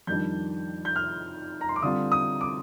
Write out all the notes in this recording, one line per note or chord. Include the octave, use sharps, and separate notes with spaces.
F2 D#3 G3 D4 G6
G6
F6
A#5
C6
D6
D3 G3 C4 F4 D#6
D#6
D6